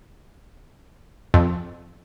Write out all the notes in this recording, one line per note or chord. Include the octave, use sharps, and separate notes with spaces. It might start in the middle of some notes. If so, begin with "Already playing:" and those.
F2